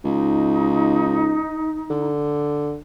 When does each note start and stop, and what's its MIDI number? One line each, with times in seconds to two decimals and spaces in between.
0.04 1.41 37
0.04 2.09 63
1.90 2.77 50